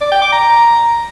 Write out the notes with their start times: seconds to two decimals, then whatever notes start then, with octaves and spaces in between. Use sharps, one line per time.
0.01 D5
0.11 G5
0.22 D6
0.32 A#5